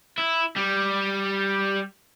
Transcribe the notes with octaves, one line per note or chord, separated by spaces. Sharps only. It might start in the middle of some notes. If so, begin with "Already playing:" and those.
E4
G3